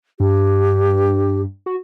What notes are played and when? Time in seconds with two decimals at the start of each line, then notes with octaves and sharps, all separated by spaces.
0.20 G2 G4
1.66 F#4